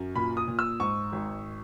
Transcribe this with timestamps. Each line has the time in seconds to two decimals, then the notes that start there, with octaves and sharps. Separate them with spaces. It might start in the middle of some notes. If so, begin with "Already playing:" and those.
Already playing: F#2
0.15 A#2 B5
0.37 D#6
0.48 A#2
0.59 E6
0.80 G#2 C#6
1.12 G#1